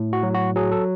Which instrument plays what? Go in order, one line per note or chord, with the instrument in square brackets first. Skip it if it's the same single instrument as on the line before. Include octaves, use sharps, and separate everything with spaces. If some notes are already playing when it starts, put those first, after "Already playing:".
Already playing: [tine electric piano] A2
F#4
F#3
F#4
F#3 G#4
A4